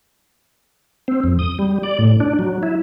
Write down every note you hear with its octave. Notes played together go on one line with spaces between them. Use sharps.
C4
F2
D#6
G3
D5
A2
D4
F#3
E4